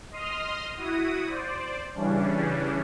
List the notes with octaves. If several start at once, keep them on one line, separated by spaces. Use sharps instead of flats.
D#5 C6 D#6 F6
E4 F#4 D#6
C5 D5
C#3 E3 G3 C#4 D4